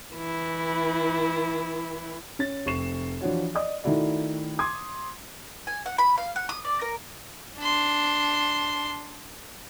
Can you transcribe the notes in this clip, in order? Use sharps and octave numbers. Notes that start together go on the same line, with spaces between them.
E3 E4
C#4 A6
F1 C4 C#6 C7 E7
E3 F3 D4 F#4 C#5
D5 D#5 D#6
D#3 A3 D#4 E4 F#4 D5
C6 D6 D#6 G#6
G#5
F#5
B5
F5
F#5
D#6
D5
A#4
D4 C6